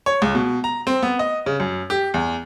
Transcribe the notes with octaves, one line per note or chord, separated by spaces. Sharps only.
C#5
C#2
B2
A#5
C4
B3
D#5
C#3
F#2
G4
E2